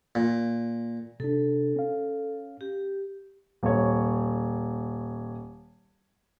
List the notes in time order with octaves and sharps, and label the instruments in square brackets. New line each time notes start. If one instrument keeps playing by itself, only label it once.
[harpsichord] A#2
[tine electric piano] C3 D4 [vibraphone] A4
[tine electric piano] C#4 F5
[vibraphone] G4
[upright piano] D#1 C#5